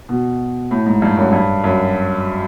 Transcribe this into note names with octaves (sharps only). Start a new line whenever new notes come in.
B2
A2
G#2
G2
F#2
G2
F#2